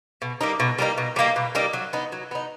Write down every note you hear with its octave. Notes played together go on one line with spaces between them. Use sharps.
B2
G3 A#3 D#4
B2
G3 A#3 D#4
B2
G3 A#3 D#4
B2
G3 A#3 D#4
F#3
B3 D#4
F#3
B3 D#4